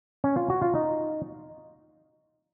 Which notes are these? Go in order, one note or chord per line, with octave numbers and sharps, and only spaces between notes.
C#4
F4
F#4
F4
D#4